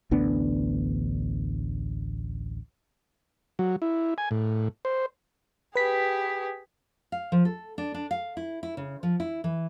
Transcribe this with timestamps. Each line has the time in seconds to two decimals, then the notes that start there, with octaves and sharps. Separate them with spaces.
0.11 A1 D2 B3 D4
3.59 F#3
3.82 E4
4.18 G#5
4.31 A2
4.85 C5
5.75 G4 G#4 B4 B6
7.12 F5
7.32 F3
7.45 A4
7.78 D4
7.94 D4
8.11 F5
8.37 E4
8.63 E4
8.77 C#3
9.03 F3
9.20 E4
9.44 E3